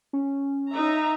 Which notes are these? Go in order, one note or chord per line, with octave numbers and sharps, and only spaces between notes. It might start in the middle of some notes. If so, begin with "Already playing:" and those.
C#4
D#4 E5 A#5